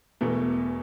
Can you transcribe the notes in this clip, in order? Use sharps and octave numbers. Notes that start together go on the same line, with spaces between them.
E1 E2 B2 A3